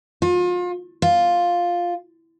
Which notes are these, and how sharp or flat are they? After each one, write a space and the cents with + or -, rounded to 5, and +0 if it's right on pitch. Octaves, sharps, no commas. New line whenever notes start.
F4 +35
F4 +5